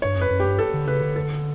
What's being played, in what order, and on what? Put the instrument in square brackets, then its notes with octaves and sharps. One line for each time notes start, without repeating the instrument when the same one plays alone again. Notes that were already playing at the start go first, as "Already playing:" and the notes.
[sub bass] G2 [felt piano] C#5
[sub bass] F#2 [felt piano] B4
[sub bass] F#2
[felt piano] G4
[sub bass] G2
[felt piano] A4
[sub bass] D3
[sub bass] C#3 [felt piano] B4
[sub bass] D3
[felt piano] A4